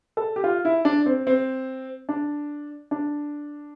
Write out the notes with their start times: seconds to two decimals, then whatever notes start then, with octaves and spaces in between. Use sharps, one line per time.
0.17 A4
0.36 G4
0.44 F4
0.65 E4
0.85 D4
1.06 C4
1.27 C4
2.09 D4
2.91 D4